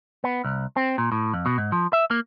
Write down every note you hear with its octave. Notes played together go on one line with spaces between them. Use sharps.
B3
C2
C4
A#2
A2
F2
B2
G#2
F3
E5
A#3